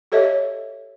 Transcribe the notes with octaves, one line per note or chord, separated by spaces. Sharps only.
G4 A4 C#5 D#5 E5